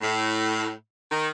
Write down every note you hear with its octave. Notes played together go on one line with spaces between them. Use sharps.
A2
D#3